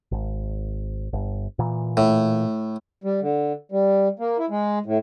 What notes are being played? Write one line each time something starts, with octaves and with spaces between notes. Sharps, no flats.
G#1
G1
A#2 E3
A2
G3
D3
G3
A#3
E4
G#3
A2